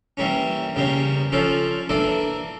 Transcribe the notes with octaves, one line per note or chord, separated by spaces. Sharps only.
E3 G3 A#3 C#4
E2 C#3 G3 A#3 C#4
F3 C#4 F4 A4 D5
E3 A#3 D4 A4 D5